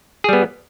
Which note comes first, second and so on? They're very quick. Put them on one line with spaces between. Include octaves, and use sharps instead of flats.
G#4 G3 B3